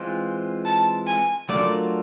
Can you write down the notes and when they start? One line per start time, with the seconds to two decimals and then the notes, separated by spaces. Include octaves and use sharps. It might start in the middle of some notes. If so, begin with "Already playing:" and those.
Already playing: E3 G#3 C4 F4
0.65 A5
1.07 G#5
1.49 F#3 A3 D4 F4 A#4 D5